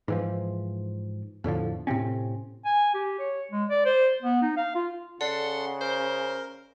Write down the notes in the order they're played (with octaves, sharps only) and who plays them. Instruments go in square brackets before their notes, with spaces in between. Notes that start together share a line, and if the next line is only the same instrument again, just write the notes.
[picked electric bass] G#2 E3 F3
E2 A2 D3 F3
A2 C3 C4 C#4
[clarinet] G#5
G4
C#5
G#3
D5
C5
B3
D#4
F5
F4
[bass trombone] C#3 [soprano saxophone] A4 [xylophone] D5 [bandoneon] F#5 C6
[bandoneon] A#4 [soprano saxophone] C5